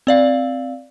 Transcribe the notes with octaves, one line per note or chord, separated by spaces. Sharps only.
C4 D5 F5